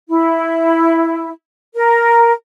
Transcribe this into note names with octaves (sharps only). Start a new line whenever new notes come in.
E4
A#4